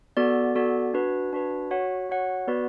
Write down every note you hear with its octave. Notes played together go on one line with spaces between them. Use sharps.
B3 F#4 A4 D5
B3 F#4 A4 D5
D4 F#4 B4
D4 F#4 B4
F#4 C#5 F#5
F#4 C#5 F#5
B3 F#4 B4 D5